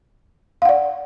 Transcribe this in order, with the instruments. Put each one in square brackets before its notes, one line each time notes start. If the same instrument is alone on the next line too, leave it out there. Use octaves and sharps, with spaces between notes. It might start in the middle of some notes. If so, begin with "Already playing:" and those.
[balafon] F5
F#5
D5